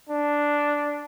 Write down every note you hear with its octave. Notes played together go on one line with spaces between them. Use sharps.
D4